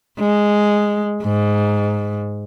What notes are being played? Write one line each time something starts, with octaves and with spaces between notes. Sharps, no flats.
G#3
G#2